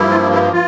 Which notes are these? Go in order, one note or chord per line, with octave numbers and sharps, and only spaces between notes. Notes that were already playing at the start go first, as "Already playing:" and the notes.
Already playing: G2 F3 A#3 E4
F4
E4
F4